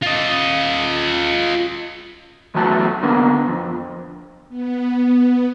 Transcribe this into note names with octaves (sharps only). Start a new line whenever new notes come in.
F4 D#5
E2 F#3 A3 F#4 G#5 A5
D3 A#3 B3
F2
B3